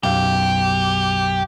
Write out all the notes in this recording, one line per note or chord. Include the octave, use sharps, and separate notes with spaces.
B1 F#2 G4 F5